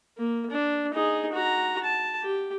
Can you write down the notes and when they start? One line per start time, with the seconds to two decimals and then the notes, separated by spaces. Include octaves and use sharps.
0.17 A#3
0.51 D4
0.93 D#4 G#4
1.33 F#4 A#5
1.84 A5
2.22 G4